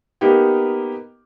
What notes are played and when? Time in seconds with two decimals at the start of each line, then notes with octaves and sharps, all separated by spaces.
0.21 A#3 B3 D#4 G4